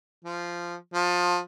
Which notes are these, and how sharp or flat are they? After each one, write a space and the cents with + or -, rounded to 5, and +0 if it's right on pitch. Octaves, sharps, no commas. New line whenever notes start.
F3 -10
F3 +25